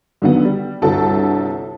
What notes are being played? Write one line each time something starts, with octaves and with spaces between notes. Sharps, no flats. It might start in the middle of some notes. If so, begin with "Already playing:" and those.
D3 D#3 F#3 B3
G3
G1 C2 D3 F#4 A4